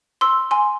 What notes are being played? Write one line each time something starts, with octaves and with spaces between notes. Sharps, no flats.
C6 E6
G#5 C6